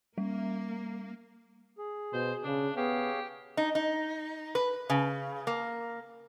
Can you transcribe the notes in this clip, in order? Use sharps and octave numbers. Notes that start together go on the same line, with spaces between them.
G3 A#3
G#4
B2 C5
C#3 D4
B3 G4 G#4 C#5 F5
D#4
D#4
B4
C#3
A#3